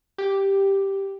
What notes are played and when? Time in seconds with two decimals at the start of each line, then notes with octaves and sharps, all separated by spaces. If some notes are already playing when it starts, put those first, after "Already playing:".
0.18 G4